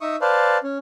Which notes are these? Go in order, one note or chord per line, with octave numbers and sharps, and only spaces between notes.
D#4 E5 C#6 D#6
B4 C5 D5 F5 A5
C#4